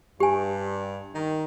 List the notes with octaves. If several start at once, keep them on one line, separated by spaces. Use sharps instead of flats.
G2 G4 G#5
D#3